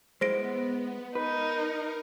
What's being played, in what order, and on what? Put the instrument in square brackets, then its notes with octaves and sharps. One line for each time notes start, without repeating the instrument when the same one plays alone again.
[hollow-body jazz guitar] G#3 E4 [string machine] B3 [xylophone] C5 A#6 D7
[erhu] D#4 [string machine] A#4 [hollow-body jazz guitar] B4